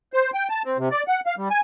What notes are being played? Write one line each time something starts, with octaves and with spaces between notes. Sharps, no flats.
C5
G5
A5
C4
C3
D5
F#5
F5
G3
G#5